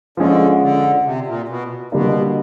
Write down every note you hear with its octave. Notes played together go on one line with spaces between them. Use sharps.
D3 F3 G#3 C#4
D3
C3
A#2
B2
B2 D3 G3 A#3 D4